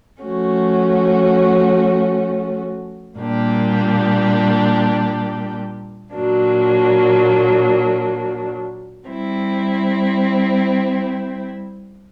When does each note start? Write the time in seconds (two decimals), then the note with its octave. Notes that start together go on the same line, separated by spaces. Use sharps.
0.22 F3 A3 C#4 F#4
3.18 A#2 G3 A#3 D4 G4
6.13 A#2 F#3 A#3 D4
9.07 G3 C4 E4